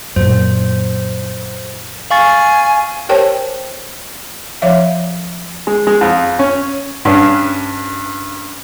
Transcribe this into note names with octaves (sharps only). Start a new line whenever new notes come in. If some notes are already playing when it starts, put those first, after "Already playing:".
F#2 A#2 C5
F5 G#5 C#6 A6
G4 A#4 C5 C#5 G5 A5
F3 C#5 E5 F5
G#3
G#3
F2
C#4
G2 C#4 D4